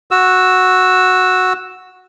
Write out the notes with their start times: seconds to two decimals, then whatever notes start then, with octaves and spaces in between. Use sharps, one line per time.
0.11 F#4 E6